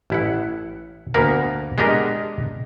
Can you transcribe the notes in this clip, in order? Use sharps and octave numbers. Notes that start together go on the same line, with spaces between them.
A1 E4 F#5
D2 A#3 B3 A#4 B4
G#3 B3 D4 G4 A#4 D#5